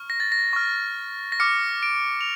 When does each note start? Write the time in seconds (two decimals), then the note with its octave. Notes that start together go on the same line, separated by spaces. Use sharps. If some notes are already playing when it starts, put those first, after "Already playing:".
Already playing: C#6 F6
0.10 A#6
0.20 A6
0.32 A#6
0.53 C#6 F6
1.32 A#6
1.40 D6 F6 C#7
1.83 D7
2.21 F7